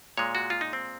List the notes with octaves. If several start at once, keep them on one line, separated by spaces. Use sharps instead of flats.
A#2 G#3 C#5
F#4
F4
D#4
C4